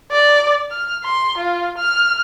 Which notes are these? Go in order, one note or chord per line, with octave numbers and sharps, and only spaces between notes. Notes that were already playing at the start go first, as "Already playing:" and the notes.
D5
F6
C6
F4
F6